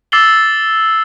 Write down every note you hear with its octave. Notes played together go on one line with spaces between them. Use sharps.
D6 E6 A6 C7 F#7 G7